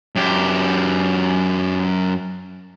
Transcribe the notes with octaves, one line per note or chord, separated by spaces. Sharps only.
F#2 G4